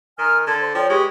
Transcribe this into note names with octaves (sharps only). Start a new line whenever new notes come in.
D#3 G#5 A#5 F6
D3 A5 C6 G#6
C5
F3 C#5 D5 G5
G#3 G4 B4 C#6